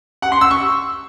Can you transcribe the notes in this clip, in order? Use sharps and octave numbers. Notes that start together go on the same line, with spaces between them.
F#5
C6
E6
C#6